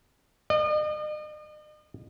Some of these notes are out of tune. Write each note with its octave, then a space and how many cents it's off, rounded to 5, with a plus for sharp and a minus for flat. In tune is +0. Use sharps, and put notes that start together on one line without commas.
D#5 -45